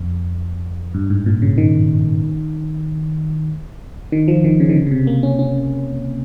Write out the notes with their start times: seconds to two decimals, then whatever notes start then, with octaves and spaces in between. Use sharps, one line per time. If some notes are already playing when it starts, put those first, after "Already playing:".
Already playing: F2
0.94 G2
1.10 G#2
1.26 A#2
1.42 C#3
1.58 D#3
4.12 D#3
4.28 F3
4.44 D#3
4.60 C#3
4.69 D#3
4.76 C#3
4.86 C#3
4.91 C3
5.07 A#3
5.23 C#4
5.39 C#4